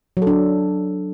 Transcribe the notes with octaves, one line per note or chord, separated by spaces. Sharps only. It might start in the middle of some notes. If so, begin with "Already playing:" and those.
F#3
A4
D4